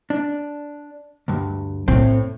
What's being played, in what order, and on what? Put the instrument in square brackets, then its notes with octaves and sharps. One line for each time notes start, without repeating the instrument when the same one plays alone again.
[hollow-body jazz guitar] D4
D2 G2
[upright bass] A2 [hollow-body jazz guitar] C4